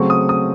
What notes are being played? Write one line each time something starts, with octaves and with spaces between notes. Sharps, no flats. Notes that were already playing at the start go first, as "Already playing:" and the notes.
Already playing: C#3 F#3 A3 C4 C#6
D#6
D#6